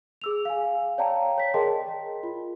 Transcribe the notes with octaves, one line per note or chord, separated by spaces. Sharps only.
G#4 E6 F7
F5 G#5
C#5 D5 F5 G5 A5 A#5
C#5 B6
G#4 A#4 D#5 G5 A5 C6
F4